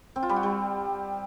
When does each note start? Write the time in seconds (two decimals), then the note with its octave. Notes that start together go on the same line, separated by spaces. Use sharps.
0.16 C4
0.23 F4
0.29 G3
0.36 F#4
0.43 G3